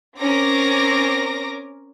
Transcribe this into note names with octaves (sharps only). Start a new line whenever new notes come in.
C4 C#4 A#4 D6 A#6